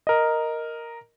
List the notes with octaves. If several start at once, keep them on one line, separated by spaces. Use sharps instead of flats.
A#4 D#5